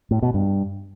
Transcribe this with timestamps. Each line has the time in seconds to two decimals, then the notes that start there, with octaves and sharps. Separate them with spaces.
0.11 A2
0.22 B2
0.34 G2